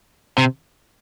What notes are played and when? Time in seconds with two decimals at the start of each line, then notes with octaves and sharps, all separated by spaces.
0.38 C3